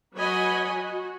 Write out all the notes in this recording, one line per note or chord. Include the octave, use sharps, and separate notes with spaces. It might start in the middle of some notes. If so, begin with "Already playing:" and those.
F#3 B4 C#5 D#5 G#5 B5
F#4